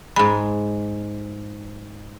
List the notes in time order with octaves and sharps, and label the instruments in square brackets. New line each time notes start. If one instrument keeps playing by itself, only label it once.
[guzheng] G#2 G#3 [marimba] B5